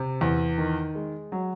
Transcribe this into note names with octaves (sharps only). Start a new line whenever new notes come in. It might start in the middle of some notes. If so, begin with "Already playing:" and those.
Already playing: C3
E2
D#3
G#3
F#3